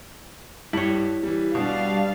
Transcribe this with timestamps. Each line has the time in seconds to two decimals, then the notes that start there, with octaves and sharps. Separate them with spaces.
0.73 G2 E4 C#5
1.23 E3 G3
1.55 B2 G3 D4 F5